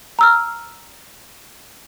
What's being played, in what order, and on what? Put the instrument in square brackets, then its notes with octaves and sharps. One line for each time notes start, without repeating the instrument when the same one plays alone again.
[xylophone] A#5 E6 F6